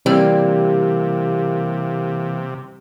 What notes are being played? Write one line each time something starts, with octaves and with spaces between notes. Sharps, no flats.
C3 E3 G3 A#3 C4